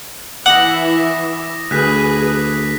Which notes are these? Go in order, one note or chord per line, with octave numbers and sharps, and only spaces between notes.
E3 E5 F#5 D6 D#6 A#6
D2 G#4 B4 F#6 B6